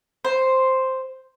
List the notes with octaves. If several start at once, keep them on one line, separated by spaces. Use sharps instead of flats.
C5